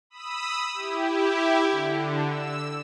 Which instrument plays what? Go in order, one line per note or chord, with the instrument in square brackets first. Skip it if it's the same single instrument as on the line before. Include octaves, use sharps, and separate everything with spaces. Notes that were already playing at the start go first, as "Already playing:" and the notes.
[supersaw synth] B5 D#6 E6
E4 G4
D3
E6